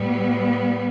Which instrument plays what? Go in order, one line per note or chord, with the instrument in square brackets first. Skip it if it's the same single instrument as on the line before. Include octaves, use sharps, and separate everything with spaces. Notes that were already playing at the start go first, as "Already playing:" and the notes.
Already playing: [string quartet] A2 G3 B3